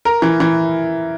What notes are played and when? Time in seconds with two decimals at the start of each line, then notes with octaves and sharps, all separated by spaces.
0.05 A#4
0.22 E3
0.40 E3